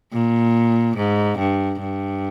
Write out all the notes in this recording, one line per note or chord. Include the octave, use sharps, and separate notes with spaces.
A#2
G#2
G2
G2